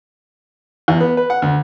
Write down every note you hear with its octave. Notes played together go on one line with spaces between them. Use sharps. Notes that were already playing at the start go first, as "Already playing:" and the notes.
E2
B3
B4
F#5
D2